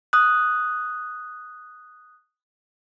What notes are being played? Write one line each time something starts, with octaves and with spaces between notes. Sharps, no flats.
D#6 F#6